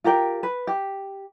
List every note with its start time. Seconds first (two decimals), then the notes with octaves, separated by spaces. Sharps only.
0.04 F4 G4 A#4 G5
0.43 B4
0.67 G4